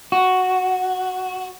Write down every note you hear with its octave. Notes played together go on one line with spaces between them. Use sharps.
F#4